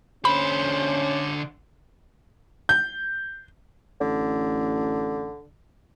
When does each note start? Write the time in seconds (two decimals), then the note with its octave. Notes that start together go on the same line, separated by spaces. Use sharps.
0.25 D3 C#4 C5 B5
2.69 G6
4.01 A1 D3